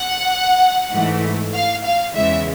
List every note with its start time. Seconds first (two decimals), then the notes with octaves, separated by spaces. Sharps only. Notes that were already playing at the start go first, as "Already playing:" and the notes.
Already playing: F#5
0.93 G#2 E3 A3
1.54 F5
1.85 F5
2.15 E2 C#3 E3 G#3 E5